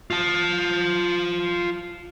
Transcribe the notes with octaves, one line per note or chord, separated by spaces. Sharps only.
F4 A5